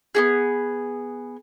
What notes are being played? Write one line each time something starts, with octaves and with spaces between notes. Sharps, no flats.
B3 F#4 G#4